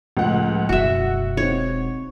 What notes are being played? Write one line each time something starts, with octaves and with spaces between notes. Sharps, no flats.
C#2 A2 F3 A3 F#5
E1 F#2 F#4 E5 F#5
C4 D#4 C#5